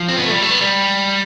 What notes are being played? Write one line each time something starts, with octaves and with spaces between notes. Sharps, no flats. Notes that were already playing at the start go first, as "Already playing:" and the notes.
Already playing: F3
C4
B3
A3
G3
A3
B3
G3